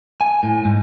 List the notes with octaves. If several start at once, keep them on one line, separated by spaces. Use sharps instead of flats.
G#5
A2
G#2